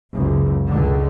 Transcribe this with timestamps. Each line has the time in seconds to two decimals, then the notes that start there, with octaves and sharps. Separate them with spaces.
0.12 F#1 C#2
0.68 C#2 D3